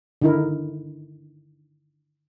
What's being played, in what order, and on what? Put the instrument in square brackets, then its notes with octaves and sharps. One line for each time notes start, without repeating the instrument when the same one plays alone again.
[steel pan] D3 D#3 D#4 E4 A#4